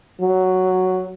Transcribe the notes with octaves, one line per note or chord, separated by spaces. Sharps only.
F#3